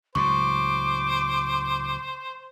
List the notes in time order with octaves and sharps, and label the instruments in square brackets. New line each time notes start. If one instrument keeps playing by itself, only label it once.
[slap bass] C#2 A2 F#3 [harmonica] C5 [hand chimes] C#6 [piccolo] D6